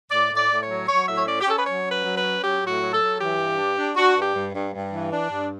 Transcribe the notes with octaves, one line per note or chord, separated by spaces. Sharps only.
A2 D5
A2
D5
A2
C#5
F#3
F#3 C#5
A2 E5
C#5
C#4 D5
G4
C#4 A4
B4
F#3 C#5
C#4
B4
F#3
B4
C#4
F#3 G4
A2
F#4
F#3
A4
F#3
E3 G4
G2
D4
D4
D4 F#4
G2
G4
G2
G2
G2
E3
D4
G2